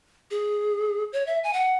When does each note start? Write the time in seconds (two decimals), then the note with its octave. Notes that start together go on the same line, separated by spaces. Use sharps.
0.31 G#4
1.13 C#5
1.27 E5
1.44 G#5
1.53 F#5